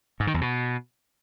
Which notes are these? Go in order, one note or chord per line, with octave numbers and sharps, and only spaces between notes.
G#2
D#3
E2
B2